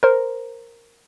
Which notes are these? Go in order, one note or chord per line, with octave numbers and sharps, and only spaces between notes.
A#4 C5